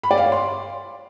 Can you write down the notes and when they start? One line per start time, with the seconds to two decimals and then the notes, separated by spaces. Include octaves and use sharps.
0.03 B5
0.11 D5
0.18 F5
0.25 C#5
0.32 C6